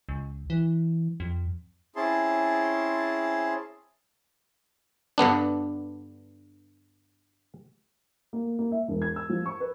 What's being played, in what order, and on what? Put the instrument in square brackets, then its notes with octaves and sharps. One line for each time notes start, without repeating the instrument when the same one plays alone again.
[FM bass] C#2
E3
F2
[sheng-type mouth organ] C4 C#4 E4 G#4 A5 C6
[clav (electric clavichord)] G2 D3 B3 D4
[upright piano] A#3
A#3
E5
E1
G#6
E6
F3
C#6
B4